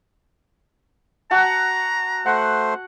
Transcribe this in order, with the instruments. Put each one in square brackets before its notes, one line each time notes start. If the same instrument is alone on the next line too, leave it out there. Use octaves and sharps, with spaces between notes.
[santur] F#4 F#5 A5 [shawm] A#5
[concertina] A3 C5 [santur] F#5